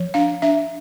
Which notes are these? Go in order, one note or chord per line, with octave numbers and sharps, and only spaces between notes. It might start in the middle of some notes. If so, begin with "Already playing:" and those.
Already playing: F3
D4 F5
D4 E5